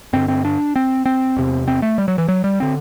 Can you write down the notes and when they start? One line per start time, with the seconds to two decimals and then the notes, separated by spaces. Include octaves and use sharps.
0.13 G2 D3 C4
0.28 C4
0.45 D4
0.76 C4
1.06 C4
1.36 E2 C3
1.68 C4
1.82 A3
1.98 G3
2.08 F#3
2.18 E3
2.28 F#3
2.44 G3
2.60 D3 C4